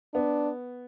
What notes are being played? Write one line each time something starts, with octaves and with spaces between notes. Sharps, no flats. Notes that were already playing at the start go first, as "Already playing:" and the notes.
B3 D4